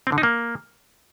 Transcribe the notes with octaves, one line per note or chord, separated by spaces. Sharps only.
C4
D3
D#4
A#3